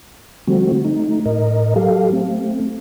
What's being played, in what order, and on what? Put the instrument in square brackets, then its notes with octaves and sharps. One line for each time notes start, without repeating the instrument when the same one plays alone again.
[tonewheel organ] D3 F3 G3 A3 C4 F#4
A3 D#4
A2 A#4 D#5
F#3 G4 A4 F5
A3 C4